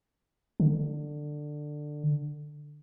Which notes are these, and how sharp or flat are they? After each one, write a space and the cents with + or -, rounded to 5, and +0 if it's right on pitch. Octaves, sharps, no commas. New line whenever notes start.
D3 +15